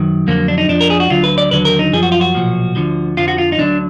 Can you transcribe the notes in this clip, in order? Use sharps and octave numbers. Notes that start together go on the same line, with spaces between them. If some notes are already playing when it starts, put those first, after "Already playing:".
Already playing: F#2 D#3 F#3
F2 D3 F#3 A#3
D4
D#4
F2 F3 D4
A#4
G#4
F#4
D2 D3 F#3 F4
B4
D5
D#2 D3 F#3 B4
A#4
D#4
F#2 F3 G#4
F#4
F4
F#4
B1 A#2 F3
D2 D3 F3
F2 D3 F3 F4
F#4
F4
D#4
D2 D3 F#3 D4